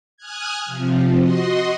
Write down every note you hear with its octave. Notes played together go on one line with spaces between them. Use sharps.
G#5 D#6 F6 F#6 G#6
C3 F3
F#4 D#5 C6